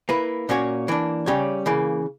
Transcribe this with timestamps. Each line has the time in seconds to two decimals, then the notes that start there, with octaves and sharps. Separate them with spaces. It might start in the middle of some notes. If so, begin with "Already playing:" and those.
0.09 A#3 E4 B4
0.49 A#2 A#3 C#4 F#4 C#5
0.88 E3 A#3 D4
1.26 C#3 G3 C#4 G4 C#5
1.66 C#3 E3 A#3